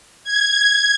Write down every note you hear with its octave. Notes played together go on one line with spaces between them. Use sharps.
G#6